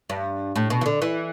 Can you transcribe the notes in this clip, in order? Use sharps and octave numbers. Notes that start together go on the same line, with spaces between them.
G2
A2
B2
E3
D3
E3